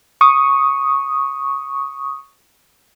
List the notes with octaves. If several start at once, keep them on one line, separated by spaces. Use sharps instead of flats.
C#6 D#6